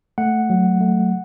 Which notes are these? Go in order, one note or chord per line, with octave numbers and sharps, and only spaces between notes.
A3 F#5
F#3
A3